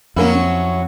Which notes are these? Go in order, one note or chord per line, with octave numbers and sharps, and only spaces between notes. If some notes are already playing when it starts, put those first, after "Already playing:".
F2 F#3 A#3 C#4 E4 A#4 F5
C4